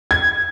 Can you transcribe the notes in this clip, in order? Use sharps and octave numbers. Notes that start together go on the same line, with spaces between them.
G#6